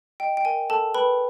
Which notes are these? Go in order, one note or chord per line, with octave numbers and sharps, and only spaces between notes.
D#5 G5
G5
A#4 G#5
A4 A#4 A5
B4 G5 B5